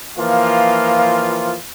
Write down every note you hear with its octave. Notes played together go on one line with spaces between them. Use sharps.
E3 F3 A#3 F4